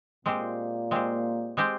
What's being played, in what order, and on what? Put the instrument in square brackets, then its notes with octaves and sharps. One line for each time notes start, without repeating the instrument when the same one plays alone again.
[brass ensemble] A#2 A#3 [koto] G#3 C4 G4 C5
[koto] G#3 C4 G4 C5
G#3 C4 G4 C5